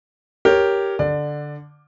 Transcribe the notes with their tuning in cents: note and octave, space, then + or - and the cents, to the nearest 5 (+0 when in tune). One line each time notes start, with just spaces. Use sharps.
G4 +0 A#4 +0 C#5 +0
D3 +0 D5 +20